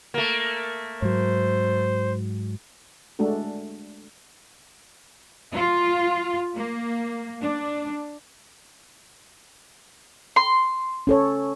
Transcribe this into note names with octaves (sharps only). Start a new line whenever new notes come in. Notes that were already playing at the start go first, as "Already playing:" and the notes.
A3 A#3
G#2 F#3 C5
G#3 A3 D4 F#4 A4
F4
A#3
D4
C6
C#4 A4 C#5